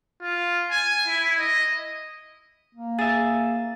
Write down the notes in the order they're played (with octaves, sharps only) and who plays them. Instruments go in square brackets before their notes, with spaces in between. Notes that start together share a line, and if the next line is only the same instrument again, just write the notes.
[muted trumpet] F4
G#5
E4
D#5
[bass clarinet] A#3
[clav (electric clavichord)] G#4 E5 [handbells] A6